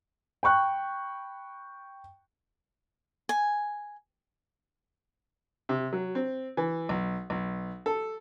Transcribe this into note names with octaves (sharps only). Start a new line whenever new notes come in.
G5 B5 C#6 F#6
G#5
C3
F#3
C4
E3
B1
B1
A4